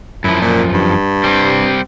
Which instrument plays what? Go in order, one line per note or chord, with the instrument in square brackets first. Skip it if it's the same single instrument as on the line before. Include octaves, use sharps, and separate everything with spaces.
[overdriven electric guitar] F#2 F3 [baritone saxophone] E4
[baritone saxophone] A#2
G2
[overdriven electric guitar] G3 C4